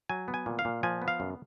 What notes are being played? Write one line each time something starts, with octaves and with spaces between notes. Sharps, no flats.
F#3 G#5
B3
G#5
A#2
F5
A#2
F3 G#5
B3
F5
F#2